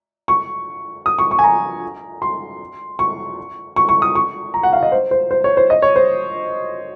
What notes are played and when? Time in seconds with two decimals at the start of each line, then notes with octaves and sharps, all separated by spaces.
0.28 C#6
1.06 D#6
1.19 C#6
1.31 C#6
1.39 G#5
1.44 A#5
2.22 C6
2.99 C#6
3.76 C#6
3.89 C#6
4.02 D#6
4.15 C#6
4.54 A#5
4.63 F#5
4.73 F5
4.83 D#5
4.92 C5
5.11 C5
5.31 C5
5.44 C#5
5.57 C5
5.70 D#5
5.82 C#5
5.96 C5